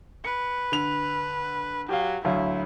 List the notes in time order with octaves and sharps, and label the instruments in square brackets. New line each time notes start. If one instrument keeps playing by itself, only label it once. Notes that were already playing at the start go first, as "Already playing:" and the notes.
[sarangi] B4 [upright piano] C#7
[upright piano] D3 F7
[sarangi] F#3 [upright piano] G4 F5
[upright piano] D2 F#3 F5 [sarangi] E4